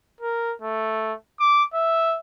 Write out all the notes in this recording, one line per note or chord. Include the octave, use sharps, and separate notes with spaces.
A#4
A3
D6
E5